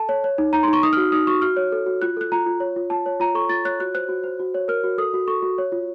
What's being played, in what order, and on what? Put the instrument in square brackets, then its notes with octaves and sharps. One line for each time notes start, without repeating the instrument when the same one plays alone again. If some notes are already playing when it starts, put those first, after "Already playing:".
Already playing: [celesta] A4 A5
C#5
C#5
D#4
D#4 A#5
C6
D#4
C#6
D#4 D#6
F6
F#4
D#4 D#6
F#4 C#6
F#4 F6
C#5
A4
F#4
F4 F#6
A4 F#6
F4 A#5
F4
C#5
F4
F4 A5
C#5
F4 A#5
A4 C#6
F4 A6
C#5 F#6
F#4 F#6
C5 F#6
F#4
C5
F#4
C#5
A#4 F6
F#4
A4 D#6
F#4
A4 C#6
F#4
C#5
F4